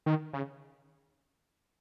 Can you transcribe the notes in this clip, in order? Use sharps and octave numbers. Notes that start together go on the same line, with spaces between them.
D#3
C#3